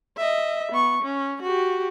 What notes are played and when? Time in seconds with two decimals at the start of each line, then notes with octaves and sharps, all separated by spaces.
0.17 D#5 E5
0.72 B3 C#6
1.03 C#4
1.42 F#4 G4